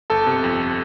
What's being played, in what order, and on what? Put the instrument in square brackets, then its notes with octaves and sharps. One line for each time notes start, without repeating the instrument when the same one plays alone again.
[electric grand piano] G1 A4 A5
C3
F2